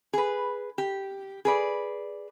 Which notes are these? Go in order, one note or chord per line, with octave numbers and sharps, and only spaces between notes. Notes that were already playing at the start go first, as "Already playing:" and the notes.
G#4 B4
G4
G#4 B4 D5